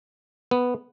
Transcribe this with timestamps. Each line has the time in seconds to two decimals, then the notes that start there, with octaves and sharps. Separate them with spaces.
0.51 B3